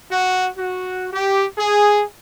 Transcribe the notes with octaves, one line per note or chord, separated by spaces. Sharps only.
F#4
F#4
G4
G#4